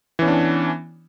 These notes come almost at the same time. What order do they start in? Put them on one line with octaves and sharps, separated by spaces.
E3 C#4 B3 D4